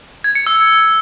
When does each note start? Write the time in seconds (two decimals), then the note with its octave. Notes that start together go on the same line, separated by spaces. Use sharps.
0.24 G#6
0.35 C#7
0.47 E6